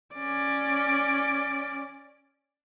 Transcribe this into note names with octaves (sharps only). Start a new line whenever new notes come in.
C#4 D5